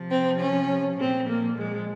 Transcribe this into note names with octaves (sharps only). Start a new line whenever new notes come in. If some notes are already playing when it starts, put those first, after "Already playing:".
Already playing: C3 F3
C4
C#4
A#2 F3 C4
A#3
G#3